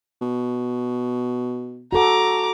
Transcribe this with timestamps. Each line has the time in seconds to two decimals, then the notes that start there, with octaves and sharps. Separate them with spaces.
0.21 B2
1.92 F#4 A4 F#5 A#5 D6